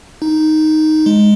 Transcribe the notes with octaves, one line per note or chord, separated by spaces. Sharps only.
D#4
G#3